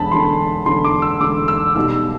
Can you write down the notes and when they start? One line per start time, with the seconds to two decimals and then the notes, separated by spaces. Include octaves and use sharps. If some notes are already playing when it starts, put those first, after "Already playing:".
Already playing: E1 E2 D3 A5 B5
0.12 E1 E2 D3 C6
0.66 E1 E2 D3 C6
0.84 D6
1.02 E6
1.21 E1 E2 D3 D6
1.48 E6
1.76 B1 B2 G3 E6